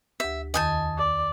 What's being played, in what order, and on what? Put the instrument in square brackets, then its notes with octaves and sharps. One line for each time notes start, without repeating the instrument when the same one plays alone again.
[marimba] D2 G4 [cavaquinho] E5
[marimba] E2 D#3 [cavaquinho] D#5 G#5 A5
[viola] D5